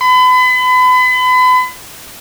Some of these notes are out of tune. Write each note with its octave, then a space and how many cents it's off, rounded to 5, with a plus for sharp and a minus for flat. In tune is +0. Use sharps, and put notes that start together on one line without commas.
B5 +35